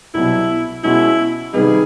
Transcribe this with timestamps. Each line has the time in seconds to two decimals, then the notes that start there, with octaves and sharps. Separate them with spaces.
0.14 C2 B2 F#3 E4
0.83 B2 G#3 C#4 E4 F#4
1.53 C3 D#3 G3 B3 D#4 G#4